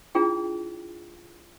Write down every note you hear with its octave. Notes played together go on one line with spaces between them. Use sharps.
D4 E4 F4 G#4 G5